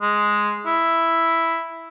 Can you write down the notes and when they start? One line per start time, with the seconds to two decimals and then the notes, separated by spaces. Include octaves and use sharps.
0.02 G#3
0.66 E4